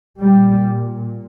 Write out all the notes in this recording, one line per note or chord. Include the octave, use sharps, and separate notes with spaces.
A#2 G3